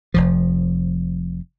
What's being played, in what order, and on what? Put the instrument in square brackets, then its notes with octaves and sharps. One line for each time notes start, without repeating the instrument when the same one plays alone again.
[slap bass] F1 F2 F3